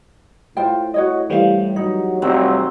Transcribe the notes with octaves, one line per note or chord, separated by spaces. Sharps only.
A2 F4 C5 G5
F#4 C#5 D#5
E3 G3 A3 C5 F5
F#3 D#4
F1 F#3 C4 C5